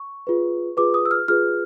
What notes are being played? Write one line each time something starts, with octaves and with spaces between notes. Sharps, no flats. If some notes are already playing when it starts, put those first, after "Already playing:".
Already playing: C#6
F4 G#4 B4
F4 G#4 B4 D6
D#6
E6
F6
F4 G#4 B4 F6